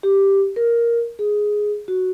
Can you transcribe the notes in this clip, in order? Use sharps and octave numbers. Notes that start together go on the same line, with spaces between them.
G4
A#4
G#4
F#4